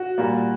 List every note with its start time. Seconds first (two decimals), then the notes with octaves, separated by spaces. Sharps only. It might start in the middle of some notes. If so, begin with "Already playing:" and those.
Already playing: F#4
0.18 A#2 G3 A#3